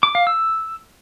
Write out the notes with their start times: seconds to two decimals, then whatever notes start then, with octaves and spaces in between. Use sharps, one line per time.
0.03 D6
0.15 F5
0.27 E6